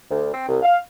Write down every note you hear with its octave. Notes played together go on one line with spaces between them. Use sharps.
D2
C4
C2
F5